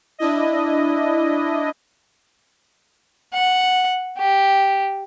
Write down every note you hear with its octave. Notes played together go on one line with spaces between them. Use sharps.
D4 E4 D#5
F#5
G4